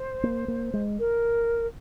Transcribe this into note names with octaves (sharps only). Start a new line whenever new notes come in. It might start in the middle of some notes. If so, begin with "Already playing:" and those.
Already playing: C5
A#3
A#3
G#3
A#4